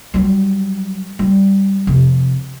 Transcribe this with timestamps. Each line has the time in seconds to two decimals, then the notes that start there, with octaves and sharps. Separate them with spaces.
0.14 F#3 G3
1.19 G3
1.87 F2 C3